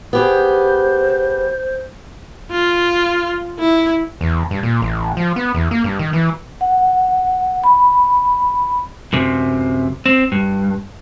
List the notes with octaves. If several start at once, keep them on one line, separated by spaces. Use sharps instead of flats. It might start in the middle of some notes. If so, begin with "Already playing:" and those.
B3 G4 G#4 C5
F4
E4
E2
G2
A#2
A1
F3
B3
E2
A#3
G2
D#3
E3
F#5
B5
F#2 C3
C4
G2